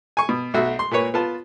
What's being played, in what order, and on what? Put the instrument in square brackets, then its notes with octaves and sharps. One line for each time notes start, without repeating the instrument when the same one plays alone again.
[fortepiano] G#5 C#6
B2
B1 A3 F#4 E5
C6
A#2 A#3 B4 C#5
B3 F4 A5